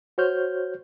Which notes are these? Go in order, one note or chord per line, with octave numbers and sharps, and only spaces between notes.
F#4 C5 C#5 F6 G6